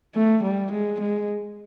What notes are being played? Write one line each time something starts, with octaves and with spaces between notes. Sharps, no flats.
A3
G3
G#3
G#3